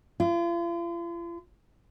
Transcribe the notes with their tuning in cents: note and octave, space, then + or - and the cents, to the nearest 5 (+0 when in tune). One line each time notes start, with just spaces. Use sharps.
F4 -40